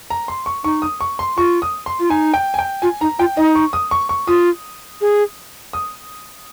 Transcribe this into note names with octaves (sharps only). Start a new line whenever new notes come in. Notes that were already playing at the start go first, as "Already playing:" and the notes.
A#5
C6
C#6
D#4 C#6
D#6
C#6
C6
F4 C#6
D#6
C6
F4
D#4 G#5
G5
G#5
G5
F4 G#5
D#4 A#5
F4 G5
D#4 D#5
C#6
D#6
C#6
C#6
F4 D#6
G#4
D#6